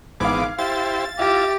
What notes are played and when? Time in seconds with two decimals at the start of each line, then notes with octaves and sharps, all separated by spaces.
0.20 G#1 G#2 E3 B3 F5 D6 G#6
0.59 E4 G4 C5 A6
1.19 E4 F4 G4 E5 A#6